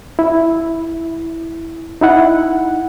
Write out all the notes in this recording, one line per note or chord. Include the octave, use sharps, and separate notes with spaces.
E4
D#4 E4 F#5